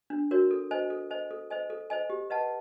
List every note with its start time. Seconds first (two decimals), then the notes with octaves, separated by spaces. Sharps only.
0.10 D4
0.31 F#4 A#4 C#5
0.51 A4
0.71 C5 D#5 G#5
0.90 A4
1.10 C5 D#5 G#5
1.31 A4
1.50 C5 D#5 G#5
1.70 A4
1.90 C5 D#5 G#5
2.10 G4
2.30 B4 D#5 F#5 A5